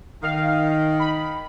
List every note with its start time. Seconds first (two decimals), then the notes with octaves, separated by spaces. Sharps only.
0.23 D#3 F5
0.99 B5